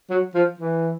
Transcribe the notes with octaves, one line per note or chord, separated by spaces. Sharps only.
F#3
F3
E3